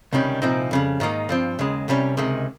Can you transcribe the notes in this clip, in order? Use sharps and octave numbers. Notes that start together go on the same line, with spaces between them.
C#2 C3 D#3 G3 C#4
C2 A#2 F3 C4 D#4
F2 C#3 G3
G#2 D#3 A#3 D#4
G2 F3 C4
D#2 C#3 G#3
C2 C3 G3 C#4
C#2 C3 D#3 G#3